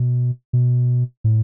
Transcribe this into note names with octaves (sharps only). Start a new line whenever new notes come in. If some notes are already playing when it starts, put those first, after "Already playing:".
Already playing: B2
B2
A2